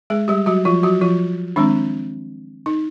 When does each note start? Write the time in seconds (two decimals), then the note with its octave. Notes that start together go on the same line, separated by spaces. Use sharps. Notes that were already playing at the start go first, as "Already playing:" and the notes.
0.10 G#3 G#4
0.28 G3 G4
0.46 F#3 F#4
0.65 F3 F4
0.83 F#3 F#4
1.01 F3 F4
1.56 D#3 G#3 C4 D4
2.66 D#4